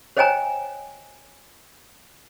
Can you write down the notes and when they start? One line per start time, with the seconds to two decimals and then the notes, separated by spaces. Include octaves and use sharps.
0.17 C5 C#5 D#5 G5 G#5 A#5